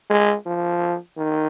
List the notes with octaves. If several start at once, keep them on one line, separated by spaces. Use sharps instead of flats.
G#3
F3
D#3